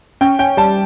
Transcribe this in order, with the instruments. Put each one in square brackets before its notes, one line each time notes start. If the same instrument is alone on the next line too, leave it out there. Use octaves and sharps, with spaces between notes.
[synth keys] C#4 [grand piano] G5
[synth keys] C#4 [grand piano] G5
[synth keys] G3 [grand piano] A5